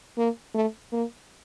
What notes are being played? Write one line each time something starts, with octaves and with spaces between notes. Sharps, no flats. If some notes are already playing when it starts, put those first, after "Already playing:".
A#3
A3
A#3